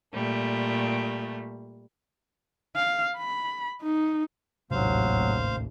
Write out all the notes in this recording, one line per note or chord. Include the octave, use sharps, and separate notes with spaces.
A#2 G3 A3
F5
B5
D#4
D1 A1 D#2 G#2 C3 F#3 C5 F5